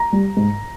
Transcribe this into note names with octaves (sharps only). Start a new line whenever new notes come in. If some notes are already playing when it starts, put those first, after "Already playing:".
Already playing: A#5
G3
G#2